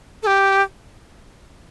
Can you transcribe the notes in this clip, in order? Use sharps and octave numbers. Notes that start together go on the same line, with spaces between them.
A4
G4